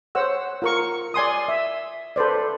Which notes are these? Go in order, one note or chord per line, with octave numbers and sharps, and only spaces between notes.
C5 C#5 F#5 E6
F4 A#4 C#6
D5 G#5 C6 D#6
E5
A4 B4 C5 D5